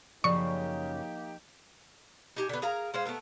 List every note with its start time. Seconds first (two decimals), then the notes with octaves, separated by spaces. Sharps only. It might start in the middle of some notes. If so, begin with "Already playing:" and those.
0.24 F#2 C#3 F3 A#3 D#4 G4 D5 C#6
2.36 D#4 G4 G#5
2.49 D3 B3
2.62 G#4 A#4 F5 A#5
2.94 G#3 C5 F5
3.05 A3 B3 A4 A#4